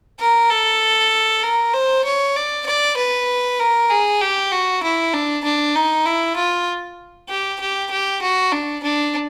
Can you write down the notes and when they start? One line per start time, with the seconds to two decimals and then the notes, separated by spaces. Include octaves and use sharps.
0.20 A#4
0.50 A4
1.43 A#4
1.74 C5
2.05 C#5
2.36 D5
2.67 D5
2.97 B4
3.60 A#4
3.90 G#4
4.21 G4
4.52 F#4
4.83 E4
5.14 D4
5.44 D4
5.75 D#4
6.06 E4
6.37 F4
7.29 G4
7.61 G4
7.91 G4
8.22 F#4
8.53 D4
8.83 D4